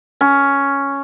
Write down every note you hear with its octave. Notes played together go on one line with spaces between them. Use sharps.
C#4